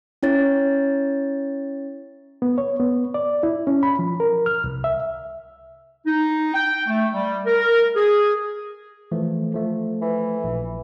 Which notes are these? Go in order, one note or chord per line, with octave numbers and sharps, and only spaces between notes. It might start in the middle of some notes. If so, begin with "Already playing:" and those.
C#4 E4 C#5 A6
B3
C#5
B3
D5
E4
C#4
B5
F3
A#4
F6
C2
E5
D#4
G5
A3
G3
A#4
G#4
E3 F3 A3
F3 A3
E3
A#1